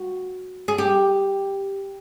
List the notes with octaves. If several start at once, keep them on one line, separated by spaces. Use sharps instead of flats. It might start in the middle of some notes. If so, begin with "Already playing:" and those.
Already playing: F#4
G#4
G4